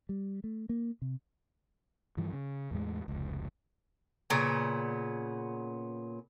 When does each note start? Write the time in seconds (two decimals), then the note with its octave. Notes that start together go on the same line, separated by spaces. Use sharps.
0.09 G3
0.44 A3
0.69 A#3
1.02 C3
2.17 G2 E3 F3
2.33 C#3
2.71 E2 A2 G#3
3.08 F1 C#2
4.30 A#2 C#3 B3